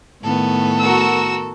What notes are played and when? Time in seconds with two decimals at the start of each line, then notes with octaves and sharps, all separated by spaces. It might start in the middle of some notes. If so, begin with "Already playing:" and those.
0.22 A2 D#3 B3 A4
0.79 F#4 A#4 E6